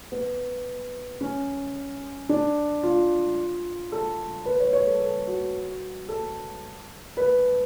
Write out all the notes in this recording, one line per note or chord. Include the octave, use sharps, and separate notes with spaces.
B3
C#4
D4
F4
A4
B4
C#5
C#5
A4
A4
F#4
A4
B4